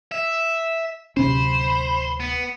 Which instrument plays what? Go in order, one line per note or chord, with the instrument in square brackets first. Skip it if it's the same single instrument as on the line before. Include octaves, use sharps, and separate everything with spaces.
[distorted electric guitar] E5
[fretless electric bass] D1 C3 C#4 [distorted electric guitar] C5 [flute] B5
[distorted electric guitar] B3